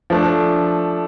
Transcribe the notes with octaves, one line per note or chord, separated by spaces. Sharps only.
F3 A3 D4